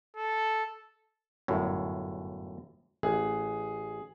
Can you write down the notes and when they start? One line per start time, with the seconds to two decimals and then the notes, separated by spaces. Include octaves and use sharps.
0.17 A4
1.48 G1 F#2 A2
3.03 A1 G#4